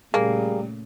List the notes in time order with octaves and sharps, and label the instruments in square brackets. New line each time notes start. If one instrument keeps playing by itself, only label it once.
[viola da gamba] A#2 C#3 A3 [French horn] G3 [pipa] A#3 [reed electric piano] G#4